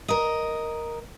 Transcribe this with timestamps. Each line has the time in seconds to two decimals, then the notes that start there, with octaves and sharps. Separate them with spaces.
0.08 A#4 D#5